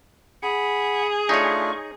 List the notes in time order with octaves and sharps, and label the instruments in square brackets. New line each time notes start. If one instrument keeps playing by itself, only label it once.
[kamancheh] G#4 [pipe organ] F#5 [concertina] B5
[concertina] A3 D4 F4 [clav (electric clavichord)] D#4 C#5 [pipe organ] C#6